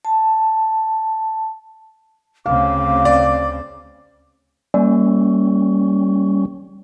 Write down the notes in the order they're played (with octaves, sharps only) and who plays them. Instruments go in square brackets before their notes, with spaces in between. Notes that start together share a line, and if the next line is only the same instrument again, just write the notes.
[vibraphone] A5
[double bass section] D2 C#3 C4 [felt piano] F5 [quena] D6
[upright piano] D5
[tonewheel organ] G3 C#4 [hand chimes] A#3